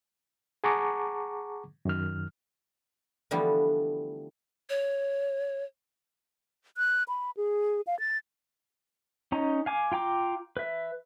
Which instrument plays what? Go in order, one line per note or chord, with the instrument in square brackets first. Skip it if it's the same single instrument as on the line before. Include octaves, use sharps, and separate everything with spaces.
[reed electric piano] G#4 F#5 A5 A#5 C#6 D6
F#2 D#3 F6
[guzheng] D3 E3 F3 G3 A3 B3
[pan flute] C#5
[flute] F#6
B5
G#4
F5
A6
[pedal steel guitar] C#4 D#4 A#5
F5 G#5 D6
F4 G5 A#5 D6
B4 E5